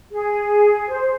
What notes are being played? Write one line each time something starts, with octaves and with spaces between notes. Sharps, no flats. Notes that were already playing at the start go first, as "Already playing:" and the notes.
G#4
C5